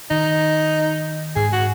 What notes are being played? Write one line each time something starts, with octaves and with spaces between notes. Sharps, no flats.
D#3 D#4
G#2 G#4
F#4